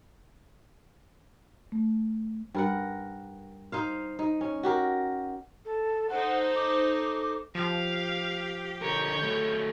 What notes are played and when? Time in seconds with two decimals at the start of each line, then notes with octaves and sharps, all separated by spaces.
1.72 A3
2.55 G2 A#4 F#5
3.72 D#4 C5 F5
4.19 D#4
4.41 C#4
4.63 F#4 G4 A#4
5.65 A4
6.10 D#4 A4 C5 F#5
6.56 D6
7.55 F3 G4 F5
8.82 D3 A#4 C#5 G6
9.23 F#3 A3